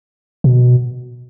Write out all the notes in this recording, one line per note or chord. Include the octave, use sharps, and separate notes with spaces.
B2